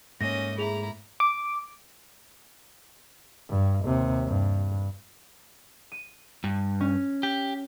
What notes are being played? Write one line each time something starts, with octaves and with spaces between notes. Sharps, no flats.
G#2 A3 A#3 C#4 D#5 A#6
E4 G#4 A#5 F7
D6
G2
D#2 C3
G2
D#7
G2
C#4
G4